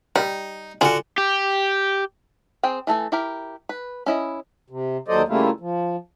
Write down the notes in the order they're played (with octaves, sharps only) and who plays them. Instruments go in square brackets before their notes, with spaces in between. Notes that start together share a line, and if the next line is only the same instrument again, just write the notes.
[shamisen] G3 [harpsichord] D#4
[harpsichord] D3 F#4 [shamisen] F4 G#4
[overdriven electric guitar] G4
[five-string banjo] C4 G#4 G5
E3 A3 A4 G#5
E4 G4 A#4
B4
C#4 E4 D#5
[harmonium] C3
D#2 F#3 A4 C5 D5 D#5
C#3 G3 A3 A#3 E4 F4
F3